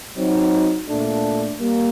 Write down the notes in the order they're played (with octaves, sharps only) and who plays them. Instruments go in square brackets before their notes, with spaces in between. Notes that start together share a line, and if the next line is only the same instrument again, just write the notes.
[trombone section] F#3 C4 D#4 F#4
A#2 A3 D4
G3 A#3